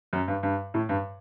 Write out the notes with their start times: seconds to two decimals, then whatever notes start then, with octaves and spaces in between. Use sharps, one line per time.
0.13 F#2
0.28 G2
0.43 G2
0.74 A2
0.89 G2